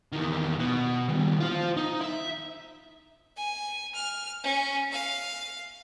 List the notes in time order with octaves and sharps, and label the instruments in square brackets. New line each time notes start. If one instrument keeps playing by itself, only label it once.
[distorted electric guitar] E2 D#3
B2
G2 D#3
F4 C5
D#4
E5
[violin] G#5
F6
C#4
F5